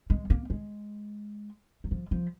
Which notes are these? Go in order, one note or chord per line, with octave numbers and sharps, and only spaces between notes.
G#3
A#3
G#3
F#3
F3
F3